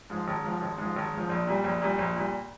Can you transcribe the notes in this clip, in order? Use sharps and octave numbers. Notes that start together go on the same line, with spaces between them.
G#2 F3
G#1
G#2 F3
G#1
G#2 F3
G#1
G#2 F3
A#1
A#2 G3
A#1
A#2 G3
A#1
A#2 G3